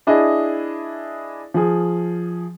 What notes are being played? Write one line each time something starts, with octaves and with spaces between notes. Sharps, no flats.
D4 E4 G#4 D#5
F3 G#4